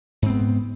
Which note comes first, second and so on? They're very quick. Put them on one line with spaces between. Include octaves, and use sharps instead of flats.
G#2 C4 B3